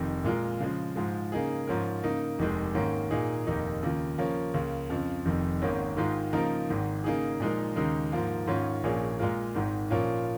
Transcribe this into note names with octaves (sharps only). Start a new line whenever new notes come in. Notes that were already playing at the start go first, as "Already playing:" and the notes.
Already playing: F1 F2 D#3
A#2 G#3 F4 A#4
C#3 F3 G#3
G#2 F3 G#3
C#3 A#3 D#4 G#4
G#2 F3 C#4 A#4
C#3 A#3 D#4
F1 D#2 D#3 G#3
G#2 D#3 A#3 C#4
A#2 A#3 D#4 G#4
F1 D#2 D#3 A#3 D#4
D#2 C#3 A#3 F4
C#3 F3 A#3 C#4
C#2 C#3 A#3
F2 C#3 F3
F1 F2 D#3
G#1 G#2 D#3 A#3 C#4
G#2 D#3 G#3 F4
C#3 F3 A#3 D#4 A#4
G#1 G#2 D#3
C#3 A#3 D#4 G#4
A#2 F3 G#3 D#4 A#4
D#2 C#3 G#3 D#4 A#4
G#2 F3 A#3
G#2 D#3 C#4 F4
A#1 A#2 A#3 C#4 G#4
A#2 G#3 F4 A#4
G#1 G#2 D#3
A#2 F3 A#3 C#4 F4